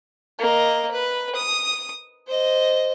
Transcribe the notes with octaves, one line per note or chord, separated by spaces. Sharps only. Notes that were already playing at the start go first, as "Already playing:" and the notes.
A#3 D#5
B4
D#6
C5 D#5